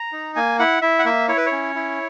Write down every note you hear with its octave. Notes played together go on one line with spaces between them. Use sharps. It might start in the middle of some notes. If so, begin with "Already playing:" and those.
Already playing: A#5
D#4
A#3 G#5
E4 F#5
E4 E5
F#5
A#3 E5
E4 C#5
B4
C#5
C#4
E4